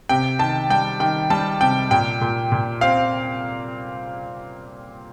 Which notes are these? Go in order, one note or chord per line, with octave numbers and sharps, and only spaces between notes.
C3 G5
D#3 A5
G3 G5
D#3 G5
G3 A5
C3 G5
A#2 G5
A#2
A#2
C4 F5